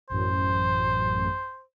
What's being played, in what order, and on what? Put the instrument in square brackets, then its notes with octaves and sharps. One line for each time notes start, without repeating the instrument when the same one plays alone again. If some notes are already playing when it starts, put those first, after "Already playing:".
[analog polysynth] A1 F#2 [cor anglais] C5